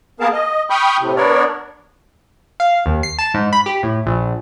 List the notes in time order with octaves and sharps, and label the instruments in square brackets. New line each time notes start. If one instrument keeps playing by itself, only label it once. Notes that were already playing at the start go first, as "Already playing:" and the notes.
[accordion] A#3 B3 G#4 A#4 F5 A5
D#5
G5 B5 C#6 D#6 F6 G6
A2 C3
B3 D4 A#4 C#5 D5
[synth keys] F5
D#2
C7
A5
G#2
B5
G4
A2
A#1